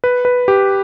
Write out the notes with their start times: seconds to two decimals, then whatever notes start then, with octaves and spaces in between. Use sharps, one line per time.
0.04 B4
0.25 B4
0.48 G4